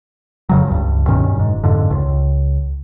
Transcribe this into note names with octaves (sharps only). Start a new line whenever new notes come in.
F2 C#3 F#3
C#2 G2
G2 B2 D#3 C#4
F#1 G#2
F2 G#2 D3
C#2